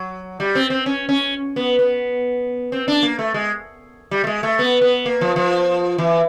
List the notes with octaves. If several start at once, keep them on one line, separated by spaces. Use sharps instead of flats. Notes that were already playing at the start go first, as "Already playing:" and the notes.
Already playing: F#3
G3
C4
C4
C#4
C#4
B3
B3
C4
D4
A#3
A3
G#3
G3
A3
G#3
A3
B3
B3
A#3
F3
F3
E3